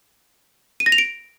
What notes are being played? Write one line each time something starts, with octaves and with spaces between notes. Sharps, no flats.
D#7
A#6
F7
D7